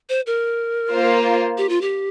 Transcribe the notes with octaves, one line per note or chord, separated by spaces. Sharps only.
C5
A#4
A#3 F4 C5
G4
F4
G4